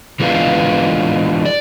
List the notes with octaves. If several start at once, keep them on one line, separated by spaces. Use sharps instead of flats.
E3 G#3 B3 D4 F4
D5